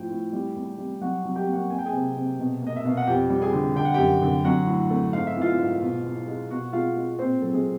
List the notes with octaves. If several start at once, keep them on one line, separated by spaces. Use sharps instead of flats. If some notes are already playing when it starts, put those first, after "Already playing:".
Already playing: A2 F3 G5
A2
G3
E2
G3
F#3 F#4 F#5
F#3
G4 G5
A#3
F#4 F#5
A#3 G#5
G5
G#4 G#5
C3
C3
B2
A#3 D#5
E5
B2 F5
F#5
F2 G4 G5
G3
G#4 G#5
D3
D3 G5
F#5
F#2 G4 G5
D3
F#3 F#4 F#5
A2
A3
G#2 F5
E5
E3
F4 F5
G#2
B2
E2
G#3
B2 F#4 F#5
G#3 F4 F5
G#3
A#2 C4 C5
F#3 A4
G#3 G#4